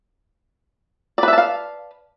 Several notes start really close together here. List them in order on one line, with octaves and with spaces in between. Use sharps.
D5 B4 E5 A5 F5